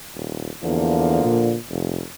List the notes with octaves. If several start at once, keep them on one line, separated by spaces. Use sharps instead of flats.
D#1
E2 D3 F3 A#3
A#2
F1